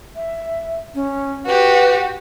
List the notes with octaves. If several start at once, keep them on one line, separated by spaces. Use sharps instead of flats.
E5
C#4
F#4 G4 B4